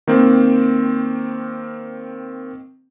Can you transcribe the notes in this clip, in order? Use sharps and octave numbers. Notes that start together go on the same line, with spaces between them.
D#3 A#3 C4